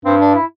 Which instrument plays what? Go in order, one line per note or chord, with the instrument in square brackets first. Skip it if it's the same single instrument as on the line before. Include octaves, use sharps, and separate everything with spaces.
[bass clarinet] G2 [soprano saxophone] C4
[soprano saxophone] D4
E4